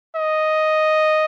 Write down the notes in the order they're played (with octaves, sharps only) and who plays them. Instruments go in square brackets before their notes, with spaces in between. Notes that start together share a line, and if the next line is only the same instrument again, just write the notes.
[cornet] D#5